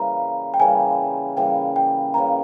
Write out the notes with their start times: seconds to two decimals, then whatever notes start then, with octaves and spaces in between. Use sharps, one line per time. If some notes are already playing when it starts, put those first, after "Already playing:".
Already playing: C#3 E3 G3 A#3 A#5
0.54 G5
0.60 C#3 E3 G3 A#3 G#5
1.37 C#3 E3 G3 A#3 G5
1.76 G5
2.14 C#3 E3 G3 A#3 A#5